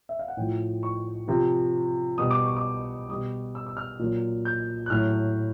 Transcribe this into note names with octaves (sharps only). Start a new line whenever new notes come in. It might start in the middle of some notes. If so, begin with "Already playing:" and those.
E5
F5
F#5
A2 F3 G5
C#6
C3 F3
B2 G3 D#6
D6
C#6
D6
B2 G3 D#6
E6
E6
F6
A#2 F#3
G6
F#6
A2 F#3 F6